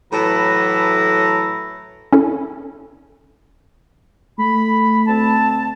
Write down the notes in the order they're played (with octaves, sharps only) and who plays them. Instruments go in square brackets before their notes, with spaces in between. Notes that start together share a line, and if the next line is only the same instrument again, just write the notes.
[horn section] A2 E3 F#3 A4 B4 A#5
[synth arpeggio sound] C#4 E4 A4
[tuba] A3 [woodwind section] B5
[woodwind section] D2 C4 A5